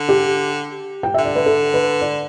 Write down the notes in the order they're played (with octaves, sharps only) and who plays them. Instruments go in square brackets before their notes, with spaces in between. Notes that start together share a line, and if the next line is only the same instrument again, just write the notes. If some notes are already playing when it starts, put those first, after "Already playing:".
Already playing: [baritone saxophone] D3
[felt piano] G4
G5
[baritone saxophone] D3 [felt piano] E5
[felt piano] D5
B4
A4
B4
D5